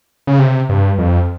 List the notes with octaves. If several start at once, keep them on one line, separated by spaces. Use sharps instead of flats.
C#3
C3
G2
F2